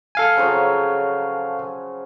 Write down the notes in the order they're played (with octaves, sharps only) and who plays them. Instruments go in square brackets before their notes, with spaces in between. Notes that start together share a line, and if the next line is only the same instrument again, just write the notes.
[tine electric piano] A4 F5 G#5
[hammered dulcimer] C#3 F3 F#3